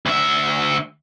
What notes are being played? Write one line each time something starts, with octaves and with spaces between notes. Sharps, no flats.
D2 E5